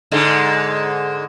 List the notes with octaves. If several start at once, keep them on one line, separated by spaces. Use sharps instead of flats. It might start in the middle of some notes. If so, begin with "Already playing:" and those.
G#2 D3 G#3